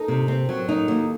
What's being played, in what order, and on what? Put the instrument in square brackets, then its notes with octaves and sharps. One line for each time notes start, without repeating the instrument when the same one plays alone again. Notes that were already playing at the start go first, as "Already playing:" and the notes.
Already playing: [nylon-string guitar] D#4 [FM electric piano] A4 A#4
[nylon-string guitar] C3
C4
F#3
D#4
D#2